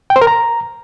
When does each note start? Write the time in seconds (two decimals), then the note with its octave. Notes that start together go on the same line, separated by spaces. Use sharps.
0.10 G5
0.16 C5
0.21 A#4
0.27 A#5